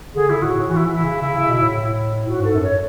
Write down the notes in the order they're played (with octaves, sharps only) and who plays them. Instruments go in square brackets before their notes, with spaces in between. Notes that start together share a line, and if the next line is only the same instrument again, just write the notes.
[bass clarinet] D3 [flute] G#4
[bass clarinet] D3 [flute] E4
[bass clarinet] A2 [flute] F#4
[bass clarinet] A2
[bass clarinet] E3 [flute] F#4
[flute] E4
[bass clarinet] E3
[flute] E4
[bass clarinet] C#3
C#3
C#3
B2
A2
[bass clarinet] A2 [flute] F#4
[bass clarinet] G#2 [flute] A4
[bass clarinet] F#2
[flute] C#5